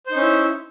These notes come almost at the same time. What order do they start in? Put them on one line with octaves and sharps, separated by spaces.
C5 D#4 C#4 E4